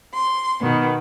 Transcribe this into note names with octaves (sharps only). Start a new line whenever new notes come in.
C6
B2 D#3 B3